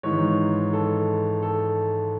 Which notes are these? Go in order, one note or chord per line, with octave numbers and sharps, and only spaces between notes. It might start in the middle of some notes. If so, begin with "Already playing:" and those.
G#1 G#2 E3 G#3 D#4 C#5
A4
A4